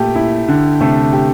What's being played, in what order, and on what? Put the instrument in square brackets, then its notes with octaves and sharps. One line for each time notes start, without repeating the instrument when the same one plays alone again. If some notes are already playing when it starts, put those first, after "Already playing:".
Already playing: [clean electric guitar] A#2 [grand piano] A3 G4
[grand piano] E4
D3
[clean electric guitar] C3 [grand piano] A3
[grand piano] G4